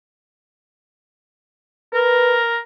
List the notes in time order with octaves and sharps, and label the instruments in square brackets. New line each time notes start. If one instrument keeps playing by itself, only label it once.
[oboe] A#4 [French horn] B4